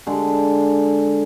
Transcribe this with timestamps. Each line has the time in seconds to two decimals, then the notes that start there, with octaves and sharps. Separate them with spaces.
0.07 D3 G#3